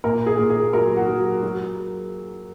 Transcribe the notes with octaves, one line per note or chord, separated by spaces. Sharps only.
A#2 A#4
G#4
A#2
G#4
F#3 A#4
F#4
F#3
F#3